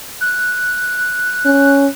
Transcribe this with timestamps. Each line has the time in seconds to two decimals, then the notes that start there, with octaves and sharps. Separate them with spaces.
0.21 F#6
1.45 C#4 F#6